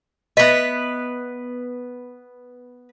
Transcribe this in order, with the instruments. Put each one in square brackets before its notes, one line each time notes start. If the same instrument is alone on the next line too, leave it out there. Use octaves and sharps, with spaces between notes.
[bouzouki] B3 B4 [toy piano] D#5 E5